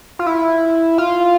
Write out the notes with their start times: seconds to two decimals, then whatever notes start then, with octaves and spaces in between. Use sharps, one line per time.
0.19 F4
0.26 E4
0.98 F4